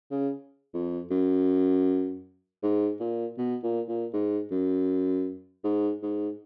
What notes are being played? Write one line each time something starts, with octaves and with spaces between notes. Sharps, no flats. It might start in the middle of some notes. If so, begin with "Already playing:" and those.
C#3
F2
F#2
G#2
A#2
B2
A#2
A#2
G#2
F#2
G#2
G#2